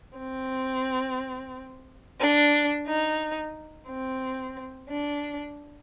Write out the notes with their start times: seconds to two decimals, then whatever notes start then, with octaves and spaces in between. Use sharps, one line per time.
0.18 C4
2.20 D4
2.87 D#4
3.87 C4
4.89 D4